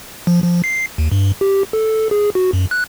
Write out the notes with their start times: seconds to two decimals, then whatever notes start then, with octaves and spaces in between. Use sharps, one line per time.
0.27 F3
0.43 F3
0.64 C7
0.98 D#2
1.12 G2
1.41 G4
1.73 A4
2.11 G#4
2.35 F#4
2.53 F#2
2.71 F#6